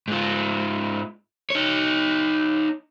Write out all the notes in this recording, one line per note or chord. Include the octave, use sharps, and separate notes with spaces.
G#2 F4
D#4 C#5